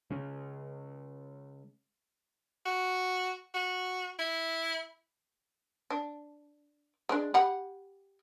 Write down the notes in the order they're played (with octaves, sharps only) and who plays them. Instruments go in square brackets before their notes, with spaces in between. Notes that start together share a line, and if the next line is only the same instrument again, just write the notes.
[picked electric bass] C#3 G#3 C#4
[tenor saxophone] F#4
F#4
E4
[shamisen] D4
G#3 D4
G4 F#5 B5